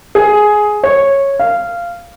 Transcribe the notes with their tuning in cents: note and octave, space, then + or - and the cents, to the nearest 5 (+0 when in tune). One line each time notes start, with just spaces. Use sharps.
G#4 +10
C#5 -10
F5 -15